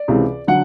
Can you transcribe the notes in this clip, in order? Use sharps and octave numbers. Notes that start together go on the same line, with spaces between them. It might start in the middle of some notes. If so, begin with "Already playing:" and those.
Already playing: D5
C#2 C3 E3
D3 F#3 F#5